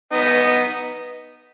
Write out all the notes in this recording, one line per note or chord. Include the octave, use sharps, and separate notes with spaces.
B3 D#4